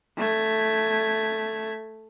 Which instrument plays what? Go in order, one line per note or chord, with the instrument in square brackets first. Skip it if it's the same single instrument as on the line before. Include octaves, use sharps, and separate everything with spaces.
[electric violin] A3 G#6